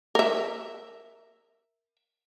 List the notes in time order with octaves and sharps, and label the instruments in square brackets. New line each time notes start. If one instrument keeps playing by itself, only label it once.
[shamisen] A#4 E5